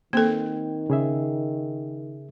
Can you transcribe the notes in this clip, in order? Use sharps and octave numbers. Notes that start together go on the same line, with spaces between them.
D#3 A#3 C4 A4 G5
C#3 G#4 E5